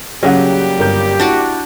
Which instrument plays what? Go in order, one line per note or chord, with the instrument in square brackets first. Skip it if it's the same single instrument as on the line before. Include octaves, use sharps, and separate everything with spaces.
[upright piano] C#3 F#3 [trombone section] G3 A#3 G4 [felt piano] F#5 G5
[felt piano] G1 A#4 G6
[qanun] D4 F#4 D5 [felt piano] E4